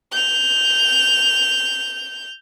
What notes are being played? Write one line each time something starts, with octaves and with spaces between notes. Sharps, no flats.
G6 F7